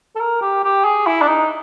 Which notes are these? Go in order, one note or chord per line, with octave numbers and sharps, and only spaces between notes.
A4
A#4
G4
G4
G#4
E4
D4
D#4